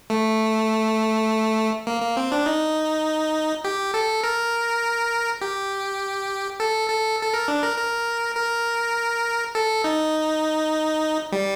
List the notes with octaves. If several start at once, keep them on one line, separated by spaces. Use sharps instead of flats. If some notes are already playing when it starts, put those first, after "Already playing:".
A3
A#3
A#3
C4
D4
D#4
G4
A4
A#4
G4
A4
A4
A4
A#4
D4
A#4
A#4
A#4
A4
D#4
G3